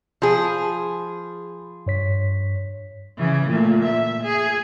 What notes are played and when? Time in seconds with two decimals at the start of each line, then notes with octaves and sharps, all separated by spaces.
0.22 F3 G#4 B5
1.86 G2 C#5 B6
3.17 C#3 E3
3.49 A#2 A3
3.84 E5
4.23 G#4